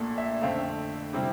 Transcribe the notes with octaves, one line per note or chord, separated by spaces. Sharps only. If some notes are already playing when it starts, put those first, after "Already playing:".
Already playing: A#1 A#2 A3
E5
F2 D3 A3 C4 F5
C3 G3 C4 E4